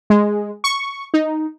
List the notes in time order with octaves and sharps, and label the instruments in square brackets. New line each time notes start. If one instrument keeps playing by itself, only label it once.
[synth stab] G#3
C#6
D#4